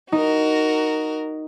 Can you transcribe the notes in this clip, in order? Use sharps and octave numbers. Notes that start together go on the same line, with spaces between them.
D#4 F#4 A#4